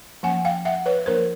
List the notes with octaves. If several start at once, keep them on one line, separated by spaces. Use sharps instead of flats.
F3 A#3 C#4 F#5 G#5
F5 G5
E5 F#5
B4 C#5
F3 A#3 D4 A#4 C5